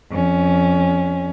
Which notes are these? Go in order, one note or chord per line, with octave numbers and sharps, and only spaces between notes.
F2 C#4